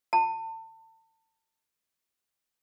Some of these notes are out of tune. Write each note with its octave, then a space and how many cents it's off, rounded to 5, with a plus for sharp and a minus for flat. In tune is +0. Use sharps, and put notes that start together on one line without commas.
A5 +30